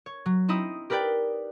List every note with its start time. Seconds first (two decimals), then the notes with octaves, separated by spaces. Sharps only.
0.06 C#5
0.26 F#3
0.48 C4 D#4 E4 D#6
0.90 G4 A#4 B4 D5 G5